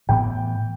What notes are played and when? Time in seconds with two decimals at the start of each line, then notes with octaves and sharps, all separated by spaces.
0.09 A2 E3 B3 G5